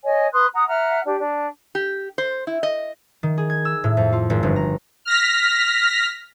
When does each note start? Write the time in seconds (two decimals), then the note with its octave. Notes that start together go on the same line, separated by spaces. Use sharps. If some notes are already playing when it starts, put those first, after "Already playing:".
0.04 C#5 D#5 G#5
0.32 B4 C6 D#6 F#6
0.53 F#5 A#5 D#6
0.67 E5 F#5 A#5 F6
1.04 D4 G4
1.18 D4
1.75 G4
2.18 C5
2.47 E4
2.63 D#5
3.23 D#3
3.38 G#4
3.50 G#6
3.65 E6
3.84 A2
3.97 F2
4.13 F4
4.30 G#1
4.43 G1
4.56 A#5
5.05 F6 A#6 B6